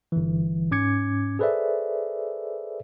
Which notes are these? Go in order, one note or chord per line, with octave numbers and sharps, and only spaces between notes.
G1 E3
G#2 C#4 D6 G#6 C#7
G#4 A4 B4 C5 D5 E5